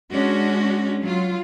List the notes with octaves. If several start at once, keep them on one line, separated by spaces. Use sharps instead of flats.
G#3 C#4 D4 F#4
F#3 F4